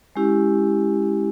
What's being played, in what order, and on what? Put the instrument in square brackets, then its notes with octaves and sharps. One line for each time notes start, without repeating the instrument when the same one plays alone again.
[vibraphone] G#3 C#4 E4 G4